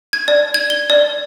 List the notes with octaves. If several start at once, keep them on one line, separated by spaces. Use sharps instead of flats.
G#6
D5
G#6
G7
D5